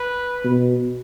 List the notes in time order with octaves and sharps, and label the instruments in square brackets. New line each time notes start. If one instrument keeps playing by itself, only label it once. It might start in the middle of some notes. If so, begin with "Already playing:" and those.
Already playing: [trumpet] B4
[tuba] B2